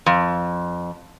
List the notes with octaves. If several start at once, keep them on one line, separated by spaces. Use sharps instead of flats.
F2